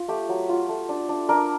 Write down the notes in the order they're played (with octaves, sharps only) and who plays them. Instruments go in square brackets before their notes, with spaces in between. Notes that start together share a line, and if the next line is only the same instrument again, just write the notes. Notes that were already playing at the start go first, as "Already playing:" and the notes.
Already playing: [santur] F4
A3 G4
F#3
F4
A3
D4
D4
D4 A#4